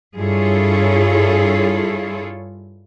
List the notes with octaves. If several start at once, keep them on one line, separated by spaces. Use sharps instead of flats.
G2 E4 F4 G#4 A4 C#5